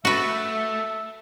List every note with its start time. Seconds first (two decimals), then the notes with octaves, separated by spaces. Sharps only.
0.05 A3 F#4 B4 E5